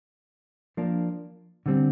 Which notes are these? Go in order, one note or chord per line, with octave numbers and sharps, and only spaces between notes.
F3 A#3 D4
D3 G3 C4